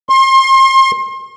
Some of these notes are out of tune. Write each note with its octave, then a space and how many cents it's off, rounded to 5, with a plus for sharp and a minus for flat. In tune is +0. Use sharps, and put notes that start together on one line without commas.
C6 +35